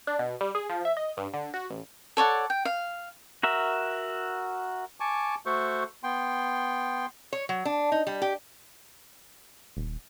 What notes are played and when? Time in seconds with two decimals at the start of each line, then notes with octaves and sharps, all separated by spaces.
0.07 D4
0.19 B2
0.41 G3
0.55 G#4
0.70 F3
0.85 E5
0.97 D#5
1.17 G2
1.34 D3
1.54 F#4
1.70 A1
2.17 A4 C#5 D5 F#5
2.50 G5
2.65 F5
3.43 F#4 A#4 E5
5.00 G#5 A5 C#6 D6
5.46 A3 F#4 A4 C5 C#6
6.03 B3 G5 C6
7.33 C#5
7.49 F#3
7.65 D4
7.92 D#4
8.07 G3
8.22 G4
9.77 D#1